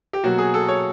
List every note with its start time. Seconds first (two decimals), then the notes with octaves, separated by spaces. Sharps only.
0.13 G4
0.24 B2 F#3 A#3 F#4
0.38 G#4
0.54 A4
0.68 C#5